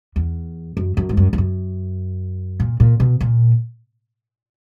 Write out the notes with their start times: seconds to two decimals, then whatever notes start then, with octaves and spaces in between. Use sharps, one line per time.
0.16 E2
0.77 F#2
0.97 F#2
1.09 G#2
1.17 F#2
1.33 E2
1.38 F#2
2.60 A#2
2.80 A#2
3.00 B2
3.21 A#2